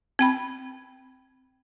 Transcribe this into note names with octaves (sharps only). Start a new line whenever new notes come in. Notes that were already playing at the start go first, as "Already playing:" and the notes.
C4 G5 B5